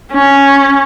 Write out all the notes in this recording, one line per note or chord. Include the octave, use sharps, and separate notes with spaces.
C#4